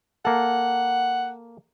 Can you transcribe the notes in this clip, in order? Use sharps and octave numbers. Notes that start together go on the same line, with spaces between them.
A#3 A4 F#5